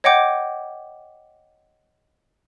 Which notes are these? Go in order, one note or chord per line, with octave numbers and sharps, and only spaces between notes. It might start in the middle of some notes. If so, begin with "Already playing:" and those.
C#5 D#5 F#5 G5 D6 G6